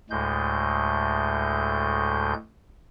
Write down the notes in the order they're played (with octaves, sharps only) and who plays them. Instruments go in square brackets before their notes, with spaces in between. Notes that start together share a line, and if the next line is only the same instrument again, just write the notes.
[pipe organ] D2 A2 G#3 G6